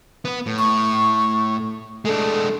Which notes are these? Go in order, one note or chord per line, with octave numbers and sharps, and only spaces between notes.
B3 B4
A2
C#6
G#3 A3 D4